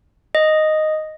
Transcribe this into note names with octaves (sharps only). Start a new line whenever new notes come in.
D#5